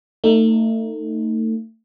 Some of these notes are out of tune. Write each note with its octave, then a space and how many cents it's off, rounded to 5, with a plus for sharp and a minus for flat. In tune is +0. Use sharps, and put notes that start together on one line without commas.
A3 +30 D#4 +0